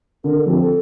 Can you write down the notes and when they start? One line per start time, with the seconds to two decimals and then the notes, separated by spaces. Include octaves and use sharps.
0.24 D3 A#4
0.37 A4
0.46 F3 C4 G4
0.60 A4